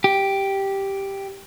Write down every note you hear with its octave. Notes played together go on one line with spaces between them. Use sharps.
G4